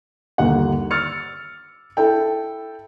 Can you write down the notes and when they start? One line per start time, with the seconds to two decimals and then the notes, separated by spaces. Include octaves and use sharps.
0.38 G1 D#2 A#3 F#5
0.91 E6 F6 A6 C#7
1.97 E4 A4 G5